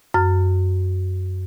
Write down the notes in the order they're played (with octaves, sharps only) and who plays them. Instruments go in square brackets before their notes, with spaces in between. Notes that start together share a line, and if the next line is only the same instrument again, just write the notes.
[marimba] F#2 F6